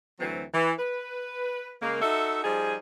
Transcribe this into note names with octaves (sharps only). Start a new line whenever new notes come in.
D2 E3 F#3 C4
E3
B4
C#3 G#3 A#3
D#4 F#4 A4 E5
F3 G3 D#4 G#4